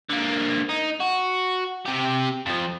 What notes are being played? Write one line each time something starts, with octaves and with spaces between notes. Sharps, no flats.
D3 A#3
D#4
F#4
C3 G4
F2 F3